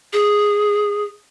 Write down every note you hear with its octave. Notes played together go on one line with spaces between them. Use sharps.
G#4